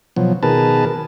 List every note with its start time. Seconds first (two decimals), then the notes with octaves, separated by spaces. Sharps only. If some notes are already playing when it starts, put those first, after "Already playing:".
0.16 B2 F3 F#3
0.43 B2 D#3 G#4 A#4 B4 A5